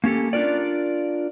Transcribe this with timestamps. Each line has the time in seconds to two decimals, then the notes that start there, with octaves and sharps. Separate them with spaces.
0.04 A#3 C#4 G4 A4
0.33 D4 F4 A#4 D5